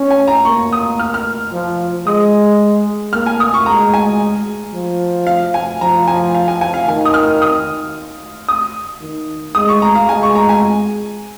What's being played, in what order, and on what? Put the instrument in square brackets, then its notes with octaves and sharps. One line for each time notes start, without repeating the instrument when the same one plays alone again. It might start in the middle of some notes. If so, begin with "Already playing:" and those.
Already playing: [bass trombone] C#4
[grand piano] G#5
A#5
[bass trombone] A#3 [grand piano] C#6
[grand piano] D#6
F6
F6
[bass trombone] F3
[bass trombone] G#3 [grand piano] D#6
[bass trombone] A#3 [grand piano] F6
[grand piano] G#5
D#6
C#6
[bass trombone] G#3 [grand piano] A#5
[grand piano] G#5
[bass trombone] F3
[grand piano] F5
G#5
[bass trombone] F3 [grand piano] A#5
[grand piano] G#5
F5
G#5
G#5
F5
[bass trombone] D#3 [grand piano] G#5
[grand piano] D#6
F6
D#6
D#6
[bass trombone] D#3
[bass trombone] G#3 [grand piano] D#6
[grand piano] C#6
A#5
F5
[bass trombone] G#3 [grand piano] G#5
[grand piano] C#6
A#5
G#5